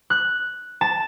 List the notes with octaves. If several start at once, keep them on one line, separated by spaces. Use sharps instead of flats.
F#6
A5